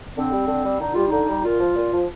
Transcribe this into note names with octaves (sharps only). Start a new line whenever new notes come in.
D3 C4
G3
D3
G3
D3 D#4
G3 F4
D3 D#4
G3
A#2 F4
F3
A#2
F3